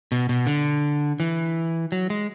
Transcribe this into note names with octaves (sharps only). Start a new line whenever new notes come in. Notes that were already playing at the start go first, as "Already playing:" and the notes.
B2
B2
D3
E3
F#3
G#3